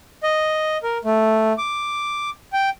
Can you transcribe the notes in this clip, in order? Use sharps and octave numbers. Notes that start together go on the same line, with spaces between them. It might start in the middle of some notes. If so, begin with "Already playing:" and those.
D#5
A#4
A3
D6
G5